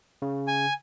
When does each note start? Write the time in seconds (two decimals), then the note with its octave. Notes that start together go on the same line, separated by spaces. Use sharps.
0.22 C#3
0.48 G#5